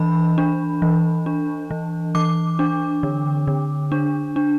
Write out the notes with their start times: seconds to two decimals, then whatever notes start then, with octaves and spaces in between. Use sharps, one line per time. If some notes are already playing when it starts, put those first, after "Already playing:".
Already playing: E3 D4 B5
0.38 D4
0.82 E3
1.26 D4
1.71 E3
2.15 E3 D6
2.59 D4
3.03 D3
3.48 D3
3.92 D4
4.36 D4